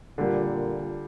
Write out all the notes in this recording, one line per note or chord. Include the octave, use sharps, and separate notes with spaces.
A#2 D3 G3 A#3